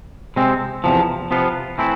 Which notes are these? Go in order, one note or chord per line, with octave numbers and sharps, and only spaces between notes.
C3 G#3 C4
E2 C3 F3
C3 F3 B3 F4
E3 A3 C4 E4